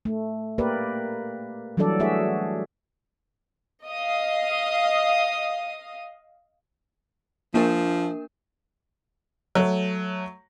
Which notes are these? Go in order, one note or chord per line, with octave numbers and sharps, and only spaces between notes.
A3
A#3 G4 A#4 B4 D5
E3 F#3 G3 D4 A4 D5
A3 F#4 G#4 E5
D#5 F5 D#6
F3 A#3 D4 A#4
F#3 A3